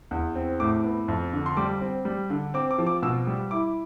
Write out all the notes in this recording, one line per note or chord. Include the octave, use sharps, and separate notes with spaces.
E2
C4
A2 D6
B3
F2
D3
C6
G3 D6
C4
G3
D3
C4 D6
D6
F3
D6
B2 E6
G3
E4 D6